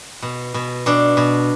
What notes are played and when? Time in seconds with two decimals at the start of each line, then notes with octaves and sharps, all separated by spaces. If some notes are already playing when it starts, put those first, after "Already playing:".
0.22 B2
0.54 B2
0.86 B2 D4
1.17 B2